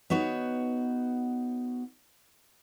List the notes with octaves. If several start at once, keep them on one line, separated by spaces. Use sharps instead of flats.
B3 D#4 F#4 C#5